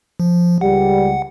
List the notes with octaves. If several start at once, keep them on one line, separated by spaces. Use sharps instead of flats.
F3
C#2 G3 F#5